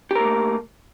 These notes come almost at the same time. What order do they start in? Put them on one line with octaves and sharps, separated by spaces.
G4 A#4 A#3 A3